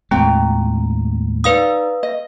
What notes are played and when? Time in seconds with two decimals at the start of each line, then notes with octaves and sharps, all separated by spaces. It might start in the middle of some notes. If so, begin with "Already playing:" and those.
0.11 D#2 A2 G#3 C4 F4 G5 A#5
1.44 D#4 B4 D5 F5 D#6
2.03 D#5